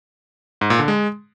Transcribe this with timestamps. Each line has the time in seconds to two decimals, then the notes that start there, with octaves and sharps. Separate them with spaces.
0.61 G#2
0.70 A#2
0.79 D3
0.88 G#3